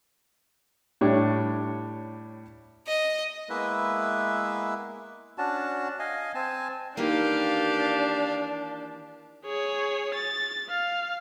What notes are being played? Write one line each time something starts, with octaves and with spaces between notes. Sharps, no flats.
A2 G3 D4 C#5
D#5
G#3 A#3 B3 E4 B4 E5
C#4 D4 F#4 A5
D#5 F5 G#5
C4 G#5 A5
D#3 E3 A#3 D4 G4 F5
G#4 C#5
A6
F5